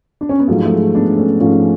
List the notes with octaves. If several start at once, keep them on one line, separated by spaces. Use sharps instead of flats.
D4
C#4
B3
G#2 F3 F#3 A3
A3
G#3
B3 D4
A3 C#4
G#2 F3 A3 C#4